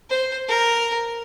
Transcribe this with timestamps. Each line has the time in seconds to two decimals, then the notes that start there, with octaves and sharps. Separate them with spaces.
0.10 C5
0.49 A#4